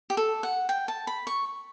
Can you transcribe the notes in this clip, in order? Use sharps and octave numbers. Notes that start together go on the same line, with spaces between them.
G4
A4
F#5
G5
A5
B5
C#6